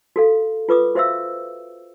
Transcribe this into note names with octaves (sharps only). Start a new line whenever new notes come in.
F#4 A4 F5
F4 B4 D6 D#6
F#4 C5 E5 F5 E6